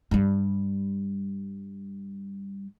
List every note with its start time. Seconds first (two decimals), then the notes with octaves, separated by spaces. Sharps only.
0.11 G2 G3